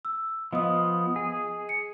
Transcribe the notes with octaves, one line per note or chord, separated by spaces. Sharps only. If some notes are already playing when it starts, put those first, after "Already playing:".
E6
F3 B3 D#5 D#6
G#4
C#7